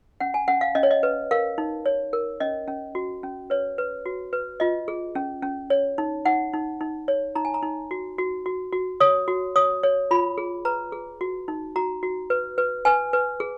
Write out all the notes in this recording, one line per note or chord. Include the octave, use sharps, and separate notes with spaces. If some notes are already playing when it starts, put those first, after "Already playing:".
C#4 F#5
G#5
C#4 F#5
F5
C#4 D#5
C#5
D#5
B4
A#4 F5
D#4
C#5
A#4
C#4 D#5
C#4
F#4
C#4
B4 C#5
B4
F#4
B4
F4 D#5
G#4
C#4
C#4
C#5
D#4
D#4 F#5
D#4
D#4
C#5
D#4 A#5
G#5
A#5
D#4
F#4
F#4
F#4
F#4
C#5 D#6
F#4
C#5 D#6
C#5
F4 B5
G#4
B4 A#5
G#4
F#4
D#4
F#4 A#5
F#4
B4
B4
B4 G#5
B4
G#4